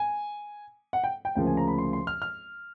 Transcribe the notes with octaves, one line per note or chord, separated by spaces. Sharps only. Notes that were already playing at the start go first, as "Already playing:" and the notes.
Already playing: G#5
F#5
G5
G5
D2 C#3 F3 A#3 C#4 G5
G#5
A#5
B5
C6
C6
F6
F6